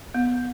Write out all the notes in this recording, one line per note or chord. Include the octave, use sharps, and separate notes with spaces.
B3